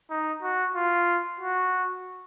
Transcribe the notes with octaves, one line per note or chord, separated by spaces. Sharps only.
D#4
F#4
F4
F#4